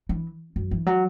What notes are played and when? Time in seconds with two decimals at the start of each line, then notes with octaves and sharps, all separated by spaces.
0.09 E3
0.56 F#2
0.71 E3
0.86 F#3